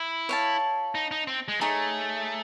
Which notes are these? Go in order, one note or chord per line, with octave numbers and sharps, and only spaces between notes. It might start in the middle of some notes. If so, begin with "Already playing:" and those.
Already playing: E4
C#5 F5 A5
D#4
D#4
C4
G#3
A3 D#4 G#4 C#5